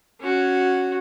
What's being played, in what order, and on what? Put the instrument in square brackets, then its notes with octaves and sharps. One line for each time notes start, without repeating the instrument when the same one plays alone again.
[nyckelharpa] C#4 F#4